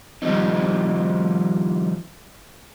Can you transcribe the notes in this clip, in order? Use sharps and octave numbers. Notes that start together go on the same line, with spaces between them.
D#3 F3 G3 C4 D#4